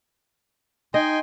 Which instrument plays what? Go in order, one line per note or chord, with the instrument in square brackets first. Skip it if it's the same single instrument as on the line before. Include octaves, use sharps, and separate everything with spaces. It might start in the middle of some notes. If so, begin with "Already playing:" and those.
[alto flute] D#4 [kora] D#5 [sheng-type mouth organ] G5 G#5 C6